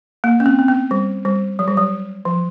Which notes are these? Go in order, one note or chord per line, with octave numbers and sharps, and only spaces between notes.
A#3
C#4
C4
C4
B3
G3
G3
F#3
G3
F#3
F3